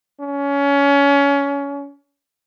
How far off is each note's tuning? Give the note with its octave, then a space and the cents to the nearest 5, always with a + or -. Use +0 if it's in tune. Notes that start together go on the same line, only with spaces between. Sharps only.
C#4 +25